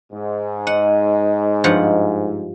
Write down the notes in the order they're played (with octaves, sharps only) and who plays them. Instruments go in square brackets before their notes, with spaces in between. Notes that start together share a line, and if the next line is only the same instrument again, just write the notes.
[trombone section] G#2
[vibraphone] D#5 [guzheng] F#5
[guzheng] G2 F3 F#5